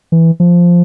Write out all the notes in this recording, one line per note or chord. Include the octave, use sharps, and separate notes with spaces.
E3
F3